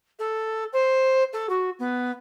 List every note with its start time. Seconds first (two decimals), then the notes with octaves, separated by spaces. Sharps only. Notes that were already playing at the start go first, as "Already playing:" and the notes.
0.19 A4
0.73 C5
1.33 A4
1.49 F#4
1.79 B3